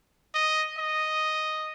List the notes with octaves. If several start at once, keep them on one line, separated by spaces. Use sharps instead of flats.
D#5
D#5